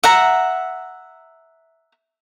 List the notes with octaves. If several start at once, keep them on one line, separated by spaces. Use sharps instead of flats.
E5 F#5 A#5